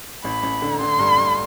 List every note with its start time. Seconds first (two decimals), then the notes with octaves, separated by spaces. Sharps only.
0.24 A1 B5
0.43 A1
0.62 D3
0.80 D3 C6
0.99 G2
1.18 G2